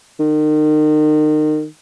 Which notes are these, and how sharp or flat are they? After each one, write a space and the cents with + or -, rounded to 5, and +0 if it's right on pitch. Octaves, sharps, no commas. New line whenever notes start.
D#3 -30